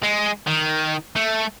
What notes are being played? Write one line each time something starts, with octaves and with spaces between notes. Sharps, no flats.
G#3
D#3
A3